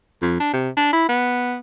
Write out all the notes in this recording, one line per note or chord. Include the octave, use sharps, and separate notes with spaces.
F2
D4
C3
D4
E4
B3